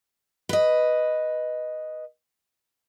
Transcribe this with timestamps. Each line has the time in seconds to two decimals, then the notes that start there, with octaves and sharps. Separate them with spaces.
0.49 B4 D#5